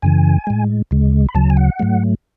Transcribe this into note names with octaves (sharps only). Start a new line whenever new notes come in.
F#2 C#3 E3 G#5
A2 G#3
D2 C#3 G#3
B5
D2 C#3 F#3 A5
G#5
F#5
G#2 F#3 A3